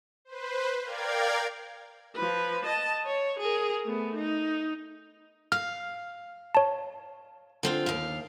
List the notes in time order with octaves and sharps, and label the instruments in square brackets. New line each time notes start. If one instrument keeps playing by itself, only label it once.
[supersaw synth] B4 C5
A#4 D5 F5 G5 G#6
[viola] F3 B4
D#5 A5
C#5
G#4 A#4
A3 B3
D#4
[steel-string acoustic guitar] F5 [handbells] F6
[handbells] C#5 A5
[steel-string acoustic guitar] D3 C4 F4
D#2 F5